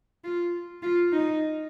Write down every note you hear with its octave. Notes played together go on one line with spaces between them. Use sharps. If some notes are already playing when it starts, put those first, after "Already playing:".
F4
F4
D#4